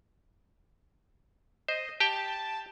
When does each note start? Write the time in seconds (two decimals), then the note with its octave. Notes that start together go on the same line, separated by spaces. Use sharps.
1.68 C5 D#5
2.00 G4 G5 A5